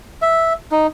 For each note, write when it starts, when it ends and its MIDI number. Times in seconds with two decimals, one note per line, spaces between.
0.22 0.53 76
0.72 0.87 63